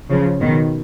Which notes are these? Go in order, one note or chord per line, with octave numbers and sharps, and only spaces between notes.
C#3 F3
B2 D#3